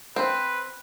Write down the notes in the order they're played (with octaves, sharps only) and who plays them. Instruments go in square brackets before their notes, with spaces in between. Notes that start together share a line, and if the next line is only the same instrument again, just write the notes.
[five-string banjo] C4 [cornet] B4